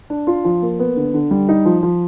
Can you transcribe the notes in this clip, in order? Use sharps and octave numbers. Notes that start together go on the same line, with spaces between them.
D4
F4
F3
A#3
B3
D3
D3
G3
D#4
F3
F3